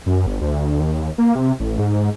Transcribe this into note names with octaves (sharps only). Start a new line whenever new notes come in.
F#2
G1
D2
D#2
A#3
C3
A1
G#2